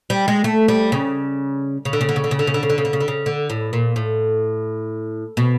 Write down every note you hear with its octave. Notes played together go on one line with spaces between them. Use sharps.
G3
G#3
A3
G3
C#3
C#3
D3
C#3
D3
C#3
D3
C#3
D3
C#3
D3
C#3
D3
C#3
D3
C#3
D3
C#3
D3
A2
A#2
A2
B2